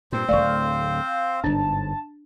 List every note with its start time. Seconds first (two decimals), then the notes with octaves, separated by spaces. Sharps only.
0.12 G2 A#2 C4 C5
0.29 D1 G#1 A3 D5 F5 C#6
1.44 G1 G#2 D4 A5